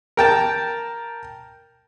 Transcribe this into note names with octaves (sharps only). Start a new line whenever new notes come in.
A#4 G5 A5